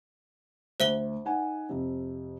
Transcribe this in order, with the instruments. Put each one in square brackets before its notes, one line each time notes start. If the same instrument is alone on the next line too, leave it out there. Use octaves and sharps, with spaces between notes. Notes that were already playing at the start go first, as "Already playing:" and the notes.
[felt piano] D2 [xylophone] C5 E5 G7
[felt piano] D#4 F#5 G#5
F2 C3